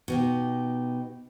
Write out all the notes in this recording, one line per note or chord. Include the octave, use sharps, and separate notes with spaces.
B2 D#4 G4